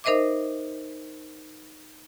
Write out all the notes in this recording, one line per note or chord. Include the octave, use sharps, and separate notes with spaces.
D#4 A#4 C5 D#5 E5 D6